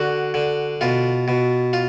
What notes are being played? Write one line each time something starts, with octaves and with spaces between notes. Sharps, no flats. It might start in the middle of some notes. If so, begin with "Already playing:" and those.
Already playing: D3 F#4
D3
B2 F4
B2
F4